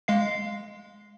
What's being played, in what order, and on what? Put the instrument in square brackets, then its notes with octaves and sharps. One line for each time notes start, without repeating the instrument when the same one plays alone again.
[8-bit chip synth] G#3 F5 C7